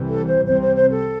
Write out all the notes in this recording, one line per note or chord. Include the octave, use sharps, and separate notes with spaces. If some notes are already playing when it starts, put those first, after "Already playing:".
Already playing: C2 C3 E3 G3
A4
C5
C2 C3 G3 C4 C5
C5
C5
A4